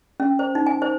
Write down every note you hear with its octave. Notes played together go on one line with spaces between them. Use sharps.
C#4
C5
D#4
G#5
C5